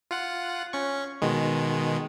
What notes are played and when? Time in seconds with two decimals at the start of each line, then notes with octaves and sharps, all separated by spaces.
0.11 F4 F#5
0.73 C#4 C#6
1.22 B2 D#3 G#3